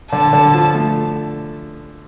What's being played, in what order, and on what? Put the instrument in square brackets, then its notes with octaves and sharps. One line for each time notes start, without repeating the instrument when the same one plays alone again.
[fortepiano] D3 [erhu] A5
[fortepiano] D3
F3
A3